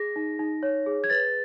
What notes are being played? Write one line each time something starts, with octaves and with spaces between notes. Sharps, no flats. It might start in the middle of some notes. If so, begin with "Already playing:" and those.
Already playing: G#4 A#6
D#4
D#4
C#5
G#4
G#6
B4 A6